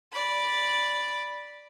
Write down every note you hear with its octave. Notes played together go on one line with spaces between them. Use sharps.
D5 B5